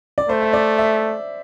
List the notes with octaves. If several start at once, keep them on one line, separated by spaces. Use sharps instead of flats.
D5
A3 C5
E5
D5
E5